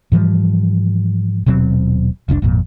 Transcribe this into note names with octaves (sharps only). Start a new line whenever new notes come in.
G#2 E3 F3 G3
D#1 B2 F#3 C4
F1 C2 C#4 D4
G#1 F2 A#2